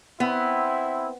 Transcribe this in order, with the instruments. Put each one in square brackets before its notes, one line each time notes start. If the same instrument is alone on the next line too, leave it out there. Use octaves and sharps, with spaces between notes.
[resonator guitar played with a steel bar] B3 [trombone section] C4 E4